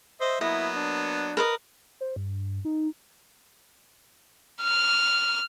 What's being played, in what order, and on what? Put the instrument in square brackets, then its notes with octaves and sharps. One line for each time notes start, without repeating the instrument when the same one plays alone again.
[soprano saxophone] C5 [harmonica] D#5 E5
[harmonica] F#3 A#3 B3 [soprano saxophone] E4 [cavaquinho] D#5
[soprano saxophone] D4
[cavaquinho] A#4 B4 D#5
[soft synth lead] C5
G2
D#4
[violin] F6